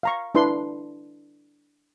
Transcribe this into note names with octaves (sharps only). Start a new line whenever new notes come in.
F5 A#5 C#6
D4 E4 B4 C6